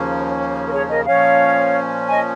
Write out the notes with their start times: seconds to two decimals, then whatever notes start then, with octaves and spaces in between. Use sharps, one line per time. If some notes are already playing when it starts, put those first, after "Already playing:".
Already playing: D#2 C#3 F3 A#3 C#4
0.67 A#4
0.72 G#4 C#5
0.89 A#4 D#5
1.06 A#2 F3 C#4 C#5 F5
2.09 D#5 G#5